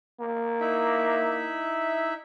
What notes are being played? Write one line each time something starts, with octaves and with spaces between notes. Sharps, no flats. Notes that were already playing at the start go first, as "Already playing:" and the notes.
A#3
D#4 E4 E5